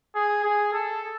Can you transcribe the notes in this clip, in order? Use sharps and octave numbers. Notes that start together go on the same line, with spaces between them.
G#4
G#4
A4